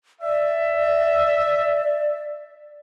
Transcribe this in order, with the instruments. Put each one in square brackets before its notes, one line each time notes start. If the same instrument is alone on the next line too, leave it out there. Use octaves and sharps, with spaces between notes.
[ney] D5 [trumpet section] E5